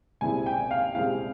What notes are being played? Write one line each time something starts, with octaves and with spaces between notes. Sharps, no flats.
C2 A#2 G#3 C4 E4 G#5
G5
F5
C2 A#2 G#3 C4 E4 F5